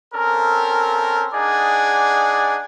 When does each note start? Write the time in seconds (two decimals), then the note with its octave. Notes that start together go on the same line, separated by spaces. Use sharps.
0.14 C4 C#4 A4 A#4
1.33 D4 D#4 G#4 D5 F#5